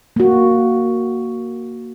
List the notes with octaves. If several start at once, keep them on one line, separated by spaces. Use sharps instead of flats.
A#3 F#4